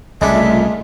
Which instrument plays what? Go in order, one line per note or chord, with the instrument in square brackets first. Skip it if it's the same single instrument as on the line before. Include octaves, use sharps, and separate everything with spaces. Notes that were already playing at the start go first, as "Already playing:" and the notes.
[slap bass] C2 C#3 [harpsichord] G#3 D4 [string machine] A3 F4 [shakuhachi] E5